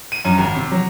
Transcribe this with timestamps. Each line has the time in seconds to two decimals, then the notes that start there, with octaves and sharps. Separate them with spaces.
0.12 D#7
0.25 F#2
0.38 G#1
0.55 C3
0.71 F#3